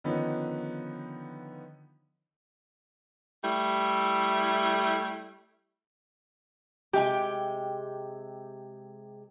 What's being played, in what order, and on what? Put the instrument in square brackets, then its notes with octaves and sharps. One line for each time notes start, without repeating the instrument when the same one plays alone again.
[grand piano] D3 D#3 F3 B3 C#4 D#4
[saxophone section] G3 A3 E4
[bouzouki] C3 G#3 G5 [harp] G4